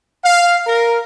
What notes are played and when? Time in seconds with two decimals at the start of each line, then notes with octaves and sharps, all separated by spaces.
0.24 F5
0.67 A#4